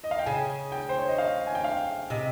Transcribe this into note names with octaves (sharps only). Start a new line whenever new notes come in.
D#5
F5
G5
C#3 G#5
G5
C5
C#5
D#5
F5
G#5
G5
F5
C3 D#5